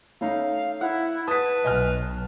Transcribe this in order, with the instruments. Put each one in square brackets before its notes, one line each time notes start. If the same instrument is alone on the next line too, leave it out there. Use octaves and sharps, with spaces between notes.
[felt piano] A3 C#4 D#4 [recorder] F5
[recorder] E4 [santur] F#5
[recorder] B4 [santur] A5 [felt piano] D#6 B6
[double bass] B1 B2 [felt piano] D#5 G#5 F6